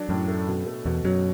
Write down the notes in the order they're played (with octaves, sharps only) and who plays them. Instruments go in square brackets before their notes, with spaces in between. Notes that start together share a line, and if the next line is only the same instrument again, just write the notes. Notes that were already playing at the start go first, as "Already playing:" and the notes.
Already playing: [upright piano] F#3 D4
[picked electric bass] F#2 [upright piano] A2
[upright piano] A3
B2
A3
[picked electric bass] E2 [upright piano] B2
[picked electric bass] F#2 [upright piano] F#3